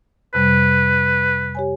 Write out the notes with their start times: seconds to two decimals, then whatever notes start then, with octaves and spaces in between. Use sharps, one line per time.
0.34 F2 C3 G3 B4
1.55 G4 C#5 G#5